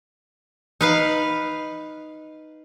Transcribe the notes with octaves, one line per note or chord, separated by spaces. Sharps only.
D#4 B4 F5